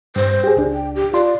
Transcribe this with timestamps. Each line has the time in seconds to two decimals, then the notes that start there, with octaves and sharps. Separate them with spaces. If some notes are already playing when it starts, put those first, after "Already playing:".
0.16 G2 C5
0.44 G4 G#4
0.57 C#2 D4
0.73 G5
0.95 G4
1.14 F4 D5 C6